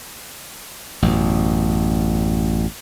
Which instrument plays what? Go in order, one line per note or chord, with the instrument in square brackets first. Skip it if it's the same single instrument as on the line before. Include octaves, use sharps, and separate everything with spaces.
[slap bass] A1 F#2 B2